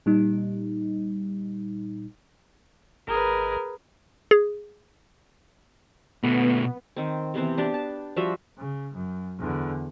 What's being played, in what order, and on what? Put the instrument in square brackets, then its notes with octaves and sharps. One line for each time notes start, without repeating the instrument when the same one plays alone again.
[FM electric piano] A#2 G3 D#4
[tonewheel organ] G#1 [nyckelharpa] G#4 B4 [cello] A#4
[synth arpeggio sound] G#4
[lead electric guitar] B2 A3 [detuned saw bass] B3
[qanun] D#3 C4
C3 E3 B3 C4
B3 D4 G4
A5
F3 G3 F#4 E5
[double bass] C#3
F#2
E2 D3